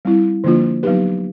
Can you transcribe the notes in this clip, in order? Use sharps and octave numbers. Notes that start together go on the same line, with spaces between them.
G3 C4 E4
D3 F3 A#3 D4 F4
F#3 B3 D#4 G4 B4